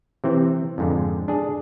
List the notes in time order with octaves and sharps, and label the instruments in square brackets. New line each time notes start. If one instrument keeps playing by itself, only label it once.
[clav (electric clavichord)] C3 E3 C4
F2 G#2 D3
D4 G#4